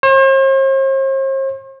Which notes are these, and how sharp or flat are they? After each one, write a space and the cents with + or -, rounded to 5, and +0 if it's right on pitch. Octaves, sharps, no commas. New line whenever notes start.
C5 +45